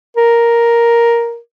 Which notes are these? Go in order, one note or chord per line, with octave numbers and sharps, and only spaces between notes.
A#4